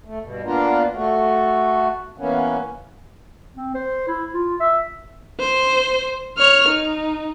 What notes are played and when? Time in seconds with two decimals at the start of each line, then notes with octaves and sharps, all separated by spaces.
0.05 A3
0.21 G2 B2
0.45 A#3 B3 D4 F4 A#4
0.94 A3 F#4
2.18 E3 A#3 B3 C#4
3.57 C4
3.75 C5
4.08 E4
4.34 F4
4.60 E5
5.40 C5
6.38 C#5 F6
6.68 D#4